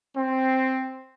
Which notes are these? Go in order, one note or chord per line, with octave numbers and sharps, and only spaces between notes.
C4